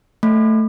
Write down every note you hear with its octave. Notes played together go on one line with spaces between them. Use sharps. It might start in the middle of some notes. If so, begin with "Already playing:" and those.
A3